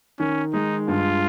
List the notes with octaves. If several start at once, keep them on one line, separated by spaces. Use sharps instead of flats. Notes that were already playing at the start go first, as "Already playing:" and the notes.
D#3 C#4
G#3 D#4
G2 F4